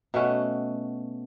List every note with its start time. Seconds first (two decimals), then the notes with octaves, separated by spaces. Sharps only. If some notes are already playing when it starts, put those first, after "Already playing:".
0.14 B2 A3 C#4 F#4